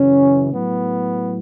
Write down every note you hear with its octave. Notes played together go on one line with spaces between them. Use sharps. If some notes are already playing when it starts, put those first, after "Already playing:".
Already playing: F#2 C#3 E3 C#4
A2 F#3 B3